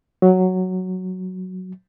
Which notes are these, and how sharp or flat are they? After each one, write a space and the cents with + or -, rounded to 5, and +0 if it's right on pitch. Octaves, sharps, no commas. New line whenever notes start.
F#3 +0